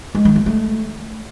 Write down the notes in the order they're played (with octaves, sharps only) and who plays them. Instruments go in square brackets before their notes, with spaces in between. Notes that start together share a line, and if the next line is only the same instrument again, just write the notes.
[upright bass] G#3
D#3
A#3
A3